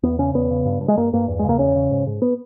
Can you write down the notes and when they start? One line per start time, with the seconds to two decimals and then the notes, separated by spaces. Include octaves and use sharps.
0.03 E2 B3
0.18 C#3 C#4
0.34 E2 B3
0.50 C#3
0.66 G2
0.81 G2
0.88 G#3
0.97 G2 A#3
1.13 G2 A#3
1.28 E2
1.39 G#3
1.45 C#3 A#3
1.59 E2 C#4
1.75 C#3
1.91 G#2
2.07 G#2
2.22 B3